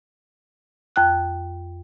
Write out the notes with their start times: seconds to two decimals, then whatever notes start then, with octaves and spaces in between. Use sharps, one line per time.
0.96 F2 G5 F#6